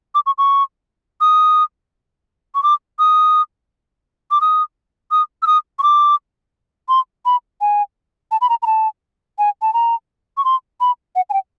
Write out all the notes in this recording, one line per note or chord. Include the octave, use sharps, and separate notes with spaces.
D6
C#6
C#6
D#6
C#6
D6
D#6
D6
D#6
D#6
E6
D#6
C#6
D6
C6
B5
G#5
A5
B5
A#5
A#5
A5
G#5
A5
A#5
C#6
C6
B5
F#5
G#5
G5